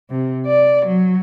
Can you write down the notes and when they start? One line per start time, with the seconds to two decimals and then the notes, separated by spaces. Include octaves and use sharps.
0.10 C3
0.46 D5
0.86 F#3